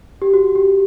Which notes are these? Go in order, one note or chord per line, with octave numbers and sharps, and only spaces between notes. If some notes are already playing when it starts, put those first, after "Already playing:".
G4
F#4
G4